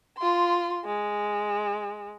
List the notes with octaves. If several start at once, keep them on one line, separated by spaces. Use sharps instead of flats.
F4 C6
G#3